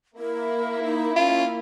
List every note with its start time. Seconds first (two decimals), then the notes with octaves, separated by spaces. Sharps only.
0.18 A#3 E4 A#4
0.84 D#4
1.16 C#4 F4